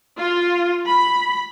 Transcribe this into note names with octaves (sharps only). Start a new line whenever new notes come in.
F4
B5